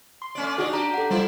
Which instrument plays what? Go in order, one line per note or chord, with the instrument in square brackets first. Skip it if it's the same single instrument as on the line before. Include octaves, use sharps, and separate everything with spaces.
[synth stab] C6
[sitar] A3 C#4 D5
[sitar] D4 D#4 D5 [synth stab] F#4 G#4
[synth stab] D4 [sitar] G4 [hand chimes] A#5
[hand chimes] A4 F#5
[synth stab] G3 F4 [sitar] E4 C5 D5